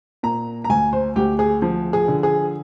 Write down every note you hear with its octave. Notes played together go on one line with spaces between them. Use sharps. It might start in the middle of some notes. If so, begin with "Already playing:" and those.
A#2 A#5
A#5
D2 G#5
C5
D2 G4
G#4
F3
G#4
D3
G#4